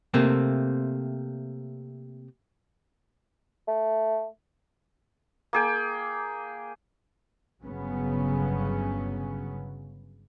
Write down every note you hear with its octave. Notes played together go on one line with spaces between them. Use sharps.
C3 A3 A#3 C4
A3
A#3 G#4 G5
G1 C#3 F#3 B3 C#4